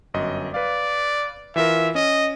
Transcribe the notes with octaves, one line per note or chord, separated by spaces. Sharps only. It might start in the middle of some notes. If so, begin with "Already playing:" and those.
G1 F#2 D#5
B4 D5 F5
E3 F4 A#4 E5
C#4 D#5